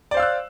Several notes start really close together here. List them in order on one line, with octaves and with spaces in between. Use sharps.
D5 C5 F5 E6 F#6